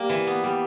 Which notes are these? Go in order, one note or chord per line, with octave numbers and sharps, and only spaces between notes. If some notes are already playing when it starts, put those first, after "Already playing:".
Already playing: G3 A#3
E3
B3
G3